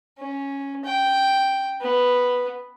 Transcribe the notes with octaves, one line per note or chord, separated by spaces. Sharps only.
C#4
G5
B3